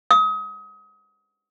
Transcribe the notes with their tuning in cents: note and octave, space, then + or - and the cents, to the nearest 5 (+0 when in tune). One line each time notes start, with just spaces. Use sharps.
D#6 +35